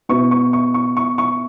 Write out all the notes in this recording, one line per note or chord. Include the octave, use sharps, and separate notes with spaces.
B2 B3 E4 C#6
C#6
C#6
C#6
C#6
C#6